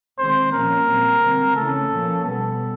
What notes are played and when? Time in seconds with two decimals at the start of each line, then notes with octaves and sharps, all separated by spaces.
0.19 D#3 G#3 C4 C5
0.53 A#2 F3 A#3 C#4 A#4
0.87 A#2 G3 C4
1.22 D3 G3 C4
1.56 C#3 E3 A3 C#4 A4
1.91 A#2 F3 A#3 C#4
2.25 B2 G3 B3 A4